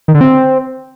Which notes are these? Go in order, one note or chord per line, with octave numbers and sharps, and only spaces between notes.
D#3
D3
C4